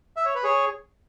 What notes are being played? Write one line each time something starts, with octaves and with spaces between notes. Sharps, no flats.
E5
C#5
B4
G#4 C#5